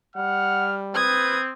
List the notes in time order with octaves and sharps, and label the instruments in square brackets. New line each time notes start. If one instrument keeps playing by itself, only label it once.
[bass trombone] G3 [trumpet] F#5 [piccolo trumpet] F6
[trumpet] C4 [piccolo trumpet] B4 [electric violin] D#6 G#6